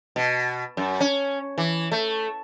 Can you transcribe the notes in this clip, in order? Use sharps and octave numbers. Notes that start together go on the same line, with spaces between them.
B2
F#2
C#4
E3
A3